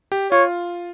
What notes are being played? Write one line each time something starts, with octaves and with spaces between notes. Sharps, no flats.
G4
F4 C#5